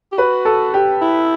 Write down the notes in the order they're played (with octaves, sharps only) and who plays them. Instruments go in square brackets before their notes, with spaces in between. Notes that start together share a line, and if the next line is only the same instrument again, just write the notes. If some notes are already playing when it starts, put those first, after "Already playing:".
[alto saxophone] G4
[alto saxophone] F#4 [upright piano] B4
[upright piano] A4
G4
[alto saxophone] E4